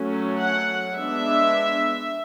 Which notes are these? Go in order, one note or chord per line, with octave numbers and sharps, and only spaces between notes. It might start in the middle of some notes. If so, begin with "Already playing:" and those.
Already playing: F#3 A3 C#4
F#5
G#3 B3 D4 E5